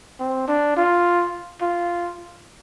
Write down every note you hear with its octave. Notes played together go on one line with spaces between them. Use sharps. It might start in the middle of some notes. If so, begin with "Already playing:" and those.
C4
D4
F4
F4